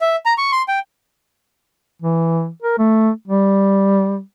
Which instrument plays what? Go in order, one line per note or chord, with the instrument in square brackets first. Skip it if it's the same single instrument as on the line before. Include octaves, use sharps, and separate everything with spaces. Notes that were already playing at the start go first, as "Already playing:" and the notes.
[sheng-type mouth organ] E5
A#5
C#6
C6
G5
[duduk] E3
A#4
A3
G3